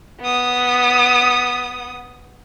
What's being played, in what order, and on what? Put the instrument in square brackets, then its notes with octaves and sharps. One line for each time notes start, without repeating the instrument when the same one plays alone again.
[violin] B3 D#6